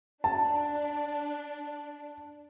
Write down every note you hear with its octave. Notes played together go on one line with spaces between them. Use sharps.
D4 A5